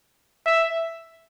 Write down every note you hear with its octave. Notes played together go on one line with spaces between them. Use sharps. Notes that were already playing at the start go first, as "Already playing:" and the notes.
E5